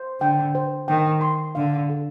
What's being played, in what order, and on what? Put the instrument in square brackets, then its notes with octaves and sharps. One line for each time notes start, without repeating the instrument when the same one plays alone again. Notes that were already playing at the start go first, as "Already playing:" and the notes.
Already playing: [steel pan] C5
[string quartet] D3 [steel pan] G5
[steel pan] C5
[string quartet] D#3 [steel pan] G5
[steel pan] C6
[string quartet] D3 [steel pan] F5
[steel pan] A4